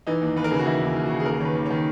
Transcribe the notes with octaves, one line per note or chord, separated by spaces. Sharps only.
E3 D#4
D#2
D#2 B4
A#4
C#3 G#4
F#4
E3 E4
D#2 E4
D#2
C#3 F#4
G#4
D#2 A#4
D#3 B4 C#5
D#2
D#3 C#5